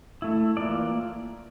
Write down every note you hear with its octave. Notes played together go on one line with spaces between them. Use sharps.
A3 E4
E3 A#3 F4 D5